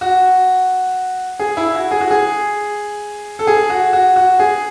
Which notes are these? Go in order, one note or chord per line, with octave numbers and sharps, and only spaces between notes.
F#4
G#4
E4
F#4
G#4
F#4
G#4
A4
G#4
F#4
F#4
F#4
G#4